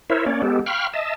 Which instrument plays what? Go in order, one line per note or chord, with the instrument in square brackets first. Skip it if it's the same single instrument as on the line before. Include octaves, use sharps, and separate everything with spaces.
[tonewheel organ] E4 A#4 C5 C#5 E5
A#3 C#4 C#5 D5
G#3 B3 G4 A4
F5 G5 B5 C#6 F6
D#5 E5 A5